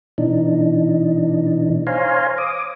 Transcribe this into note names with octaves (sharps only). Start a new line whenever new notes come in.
B2 E3 D4 D#4
C5 C#5 F5 G#5 A#5 C6
D6 D#6